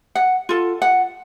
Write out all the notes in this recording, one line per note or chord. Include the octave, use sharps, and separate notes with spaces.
F#5
F4 A4
F#5